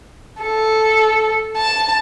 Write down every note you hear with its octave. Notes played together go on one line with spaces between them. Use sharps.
A4
A5